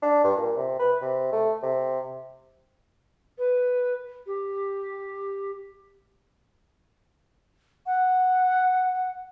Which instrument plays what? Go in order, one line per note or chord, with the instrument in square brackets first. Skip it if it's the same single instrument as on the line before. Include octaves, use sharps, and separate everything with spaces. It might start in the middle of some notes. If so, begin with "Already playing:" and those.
[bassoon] D4
G2
A#2
C3
B4
C3
A3
C3
[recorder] B4
G4
[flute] F#5